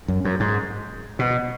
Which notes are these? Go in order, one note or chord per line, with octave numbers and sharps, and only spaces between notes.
F#2
F#2
G#2
B2